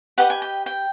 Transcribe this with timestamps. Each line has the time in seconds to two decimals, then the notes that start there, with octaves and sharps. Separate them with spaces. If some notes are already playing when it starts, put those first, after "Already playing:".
0.18 G4 B4 D#5 F#5
0.30 G#5
0.42 G5
0.66 G5